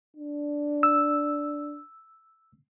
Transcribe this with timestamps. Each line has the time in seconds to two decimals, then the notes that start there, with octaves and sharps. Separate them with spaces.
0.17 D4
0.83 E6